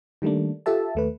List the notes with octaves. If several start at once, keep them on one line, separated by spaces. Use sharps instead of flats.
D#3 G3 A3 A#3 D4
F4 G4 A4 E5 A5
D#2 A3 B4